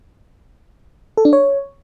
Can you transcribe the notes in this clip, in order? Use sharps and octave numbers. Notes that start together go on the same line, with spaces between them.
A4
D4
C#5